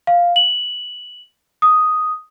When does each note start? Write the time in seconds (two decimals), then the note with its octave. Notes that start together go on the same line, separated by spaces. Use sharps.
0.07 F5
0.36 F#7
1.62 D#6